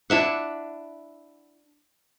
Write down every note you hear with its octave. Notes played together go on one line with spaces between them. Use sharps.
D4 E4 E5 F#5